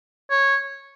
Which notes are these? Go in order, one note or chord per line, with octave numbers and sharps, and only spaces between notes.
C#5